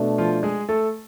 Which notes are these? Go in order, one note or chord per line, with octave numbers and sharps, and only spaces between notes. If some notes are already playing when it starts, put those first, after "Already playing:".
Already playing: B2 A3 D4
F3 F4
G#3 G#4
A3 A4